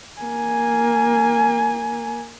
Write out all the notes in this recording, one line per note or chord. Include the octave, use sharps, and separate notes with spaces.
A#3 G#5